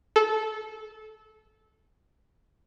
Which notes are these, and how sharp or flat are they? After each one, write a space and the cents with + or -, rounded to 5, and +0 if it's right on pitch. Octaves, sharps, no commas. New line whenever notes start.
A4 -20